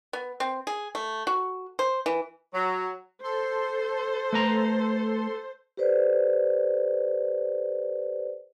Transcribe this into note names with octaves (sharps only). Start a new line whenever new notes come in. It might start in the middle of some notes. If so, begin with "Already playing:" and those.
B3
C4
G#4
A3
F#4
C5
E3
F#3
A4 C5 C6
A3 B4 A#5
G4 A4 B4 C5 D5